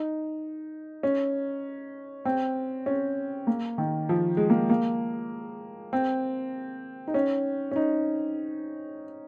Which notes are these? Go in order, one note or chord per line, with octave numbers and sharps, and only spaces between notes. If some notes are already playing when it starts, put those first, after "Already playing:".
Already playing: D#4
C#4
C4
C#4
A#3
D#3
F3
G#3
A#3
A#3
C4
D#4
C#4
C#4
D#4